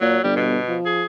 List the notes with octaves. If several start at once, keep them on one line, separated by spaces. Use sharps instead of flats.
A#2 F#3
G1 G3
B2
F3
G#4